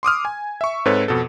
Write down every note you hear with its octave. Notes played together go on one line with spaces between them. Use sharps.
C6 D6 D#6 F6
G#5
E5 C#6
G#2 C4 A4 B4 C#5
F2 B2 A4